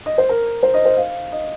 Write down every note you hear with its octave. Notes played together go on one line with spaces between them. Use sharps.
D#5
C5
A#4
C5
D#5
C5
F5
D#5